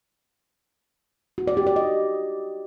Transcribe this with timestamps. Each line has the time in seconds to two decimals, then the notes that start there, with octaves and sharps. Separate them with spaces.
1.38 F#4
1.47 D5
1.57 G4
1.67 D5
1.76 D#5